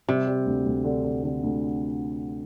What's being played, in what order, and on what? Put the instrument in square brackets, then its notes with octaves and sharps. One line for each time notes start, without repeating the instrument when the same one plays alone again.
[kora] C3 [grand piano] G3
[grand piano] G3
D2
D2
D3
D3
D3
D2